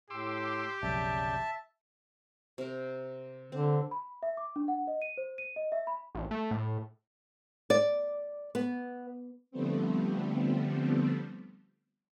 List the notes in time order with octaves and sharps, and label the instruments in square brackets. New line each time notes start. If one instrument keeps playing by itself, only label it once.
[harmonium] A2 [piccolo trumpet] G4 [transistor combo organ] C6 D6 E6
[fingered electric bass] B1 F2 [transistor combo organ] C#3 D5 G5 [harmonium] E5 A5
[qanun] C3 A#4
[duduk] D3 [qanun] C4
[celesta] B5
E5
D6
D4
F#5
D#5
D#7
C5
D#7
D#5
E5
B5
[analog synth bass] A1
A3
A2
[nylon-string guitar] D5
B3
[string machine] D3 F3 G3 A3 B3 C4